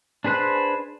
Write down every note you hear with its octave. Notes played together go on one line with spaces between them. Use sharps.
D4 G#4 B4 C5 F#6